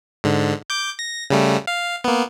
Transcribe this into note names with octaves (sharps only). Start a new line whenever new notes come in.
G#2 D3
D6 G6
A#6
C#3 G3 A3
F5
A#3 B3